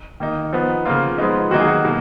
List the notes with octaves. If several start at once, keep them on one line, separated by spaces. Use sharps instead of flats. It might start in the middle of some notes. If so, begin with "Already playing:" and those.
D#3 A#3 D#4
F3 B3 D#4
C#3 F3 A#3 F4
F3 G#3 B3 D#4
D#3 F#3 A#3 D#4 F#4
G#4
F#4
B2 A#3